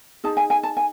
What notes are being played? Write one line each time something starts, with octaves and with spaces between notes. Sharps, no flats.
D#4 G#4 A5
G#5
G#5
A5
G#5